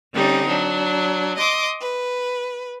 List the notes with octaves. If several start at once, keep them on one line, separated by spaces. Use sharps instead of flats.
D3 G3 C4 C#4 D#4
F#3 D4
D#5 C6 D6
B4